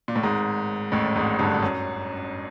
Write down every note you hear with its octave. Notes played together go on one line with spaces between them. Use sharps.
A#2
A2
G#1 G#2
A1 A2
G#1 G#2
G1 G2
F#2